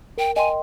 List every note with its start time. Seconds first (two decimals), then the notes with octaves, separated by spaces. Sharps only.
0.18 A#4 G5
0.36 D#5 G5 G#5 C6